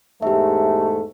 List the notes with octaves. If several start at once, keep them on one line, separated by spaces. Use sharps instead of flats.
E2 G#2 A3 G4 E5